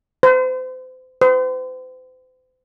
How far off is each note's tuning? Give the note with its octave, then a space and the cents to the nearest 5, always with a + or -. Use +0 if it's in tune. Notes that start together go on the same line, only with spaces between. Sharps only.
C5 -35
C5 -40